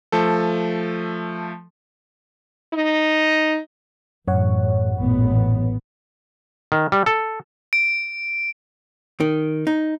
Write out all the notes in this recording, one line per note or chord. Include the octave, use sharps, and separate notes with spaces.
F3 A3 A4
D#4
A1 F#2 C#5 F#5
A1 A#2 B3
D#3
G3
A4
D7
D#3
D#4